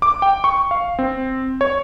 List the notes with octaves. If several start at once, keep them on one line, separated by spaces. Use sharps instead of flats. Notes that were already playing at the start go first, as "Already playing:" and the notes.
D6
G5
C#6
F5
C4
C#5